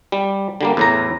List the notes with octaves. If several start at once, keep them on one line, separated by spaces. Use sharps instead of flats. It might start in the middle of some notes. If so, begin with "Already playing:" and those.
G3
D3 G3 A#3
E2 A2 A#5